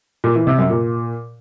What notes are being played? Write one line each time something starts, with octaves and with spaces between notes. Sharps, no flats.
A#2
E3
C3
F#2
A#2